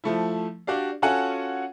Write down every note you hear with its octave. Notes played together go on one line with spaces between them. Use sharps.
F3 A3 E4
D4 F#4 G4 D5 F5
C#4 F4 F#4 A4 F#5 G#5